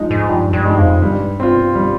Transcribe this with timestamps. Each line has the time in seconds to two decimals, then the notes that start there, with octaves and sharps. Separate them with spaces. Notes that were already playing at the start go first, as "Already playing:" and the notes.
Already playing: F3 G#3 D#4
0.11 G#2
0.28 G2 F3
0.53 G2
0.65 G#3
0.70 D#4
0.78 F2
1.02 G2 G3
1.40 C4 F4
1.75 G3